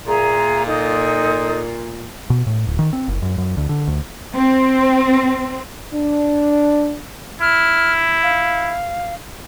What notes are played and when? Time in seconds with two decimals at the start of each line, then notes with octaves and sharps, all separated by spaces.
0.06 A#2 G#4 E5 A#5
0.65 D#4 A4 D#6
2.30 B2
2.47 A2
2.67 D1
2.79 D#3
2.93 C4
3.08 F#1
3.22 F#2
3.38 F#2
3.57 D2
3.69 D3
3.87 D2
4.34 C4
5.93 D4
7.42 E4 F6
8.23 F5